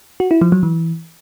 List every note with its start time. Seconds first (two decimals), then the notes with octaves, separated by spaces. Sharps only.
0.20 F#4
0.31 E4
0.41 F3
0.52 F#3
0.63 E3